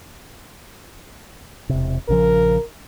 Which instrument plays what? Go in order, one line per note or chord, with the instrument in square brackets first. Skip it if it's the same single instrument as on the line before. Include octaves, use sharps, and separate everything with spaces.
[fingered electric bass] E1 C3
[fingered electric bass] A#1 C#3 F3 [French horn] A#4